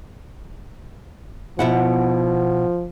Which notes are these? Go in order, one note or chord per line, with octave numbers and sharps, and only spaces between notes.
B2 F3 E4 F#5